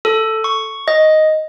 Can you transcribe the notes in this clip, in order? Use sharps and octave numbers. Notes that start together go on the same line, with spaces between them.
A4
C#6
D#5